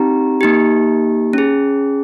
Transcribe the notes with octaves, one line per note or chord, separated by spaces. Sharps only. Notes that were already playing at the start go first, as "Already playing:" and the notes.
Already playing: C4 D#4 G4 A#5
A#3 D#4 G4
C#4 G#4